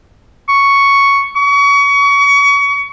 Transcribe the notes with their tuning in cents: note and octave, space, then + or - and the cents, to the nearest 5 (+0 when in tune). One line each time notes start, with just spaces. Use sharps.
C#6 +5
C#6 +30